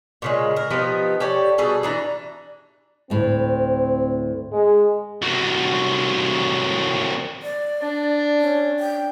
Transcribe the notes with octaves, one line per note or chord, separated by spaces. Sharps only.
A#2 C#3 G#3
A#4
F3 B3 D#4 G4
G4 A4 C#5 D5
B2 G3 G#4 A4
E3 D4 A#5
D2 A2 C4
G#3
C2 F#3
D5
D4
C#4
G5